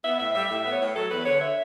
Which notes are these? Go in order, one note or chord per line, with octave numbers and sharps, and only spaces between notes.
B3 E5
A2 E5
G3 E5
A2 E5
B3
C#5
A2
F#3 A4
E2 B4
D3 C#5
E5